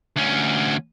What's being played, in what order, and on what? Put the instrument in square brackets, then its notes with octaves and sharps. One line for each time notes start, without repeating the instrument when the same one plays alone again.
[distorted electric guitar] D2 C#4